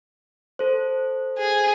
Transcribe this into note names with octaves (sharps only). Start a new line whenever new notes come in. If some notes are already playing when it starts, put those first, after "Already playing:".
A4 C5
G#4